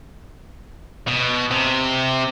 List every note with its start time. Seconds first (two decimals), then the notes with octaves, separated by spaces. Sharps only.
1.08 B2
1.51 C3